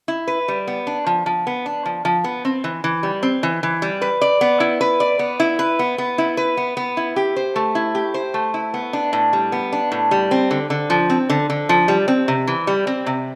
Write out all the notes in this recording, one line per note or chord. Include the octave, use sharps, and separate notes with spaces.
E4
B4
G3
B3
D4
F3
F3
B3
D4
F3
F3
B3
C4
E3
E3
G3
C4
E3
E3
G3
B4
D5
B3
E4
B4
D5
B3
E4
B4
B3
B3
E4
B4
B3
B3
E4
G4
C5
A3
E4
G4
C5
A3
E4
B3
D4
A2
G3
B3
D4
A2
G3
C4
D3
D3
F3
C4
D3
D3
F3
G3
C4
C3
E3
G3
C4
C3